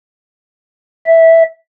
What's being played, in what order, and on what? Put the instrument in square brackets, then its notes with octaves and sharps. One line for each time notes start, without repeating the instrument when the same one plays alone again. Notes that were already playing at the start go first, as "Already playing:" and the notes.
[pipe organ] E5